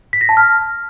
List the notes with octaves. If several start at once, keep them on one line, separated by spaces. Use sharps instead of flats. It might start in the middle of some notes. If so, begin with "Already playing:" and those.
B6
A#6
A5
F6